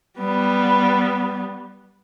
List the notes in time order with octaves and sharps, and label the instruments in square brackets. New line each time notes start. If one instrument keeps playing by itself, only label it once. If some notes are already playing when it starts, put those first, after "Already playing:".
[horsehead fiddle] G3 B3